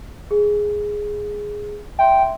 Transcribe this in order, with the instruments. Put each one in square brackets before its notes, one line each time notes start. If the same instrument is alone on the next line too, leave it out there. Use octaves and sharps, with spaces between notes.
[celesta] G#4
[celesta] E5 C6 [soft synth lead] G5